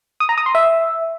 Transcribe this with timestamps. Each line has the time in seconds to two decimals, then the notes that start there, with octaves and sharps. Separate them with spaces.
0.20 D#6
0.29 A#5
0.38 D#6
0.46 C6
0.55 E5